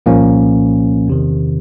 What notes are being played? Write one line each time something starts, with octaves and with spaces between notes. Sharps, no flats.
C2 A#2 F3 A#3 C#4
E2 C3 D#3